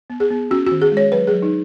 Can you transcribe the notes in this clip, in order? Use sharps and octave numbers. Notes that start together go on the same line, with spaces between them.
B3
G#4
B3
C#4 F#4
D#3 F#4
G#4
G#3
C#5
F#3 B4
G#4
F#3
D#4